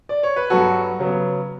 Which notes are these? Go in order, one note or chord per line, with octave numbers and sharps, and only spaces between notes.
D5
C#5
B4
G2 F#3 B3 F#4 A4
C#3 F#3 B3